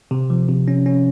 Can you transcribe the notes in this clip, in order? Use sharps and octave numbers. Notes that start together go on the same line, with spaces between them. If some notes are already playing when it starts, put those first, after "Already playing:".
C3
F3
C3
C#4
C#4